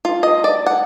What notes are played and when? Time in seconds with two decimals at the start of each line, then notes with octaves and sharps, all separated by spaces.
0.05 F4
0.23 D#5
0.44 D5
0.66 F#5